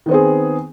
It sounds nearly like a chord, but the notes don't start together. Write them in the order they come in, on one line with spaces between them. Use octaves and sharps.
D#3 B3 C4 G#4